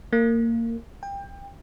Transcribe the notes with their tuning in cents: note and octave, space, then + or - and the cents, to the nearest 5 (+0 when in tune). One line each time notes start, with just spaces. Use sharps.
A#3 -20
G5 +25